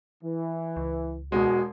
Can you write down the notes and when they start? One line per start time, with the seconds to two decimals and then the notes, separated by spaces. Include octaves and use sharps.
0.24 E3
0.77 C#2
1.32 E1 B2 G#3 F#4